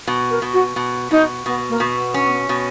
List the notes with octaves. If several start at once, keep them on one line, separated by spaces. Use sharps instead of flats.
B2
A#4
B2
F#4
B2
B2 D#4
B2 B3
A#3
B2
B3
C#4
B2